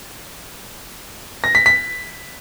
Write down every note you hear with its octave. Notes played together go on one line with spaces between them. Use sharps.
A#6
B6
B6